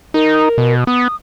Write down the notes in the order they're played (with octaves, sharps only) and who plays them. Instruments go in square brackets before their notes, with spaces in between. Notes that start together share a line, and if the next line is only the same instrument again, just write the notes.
[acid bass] D#4 [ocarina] A#4
[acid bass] B2
[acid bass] B3 [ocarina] D#6